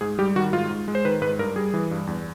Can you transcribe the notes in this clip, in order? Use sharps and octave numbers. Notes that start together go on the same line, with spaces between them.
G#2 G#4
G3 G4
D#3 F#4
G#2 F4
G#2
G#3
C5
D#3 B4
G#2 B4
G2 A#4
G3 G#4
E3
G2
E2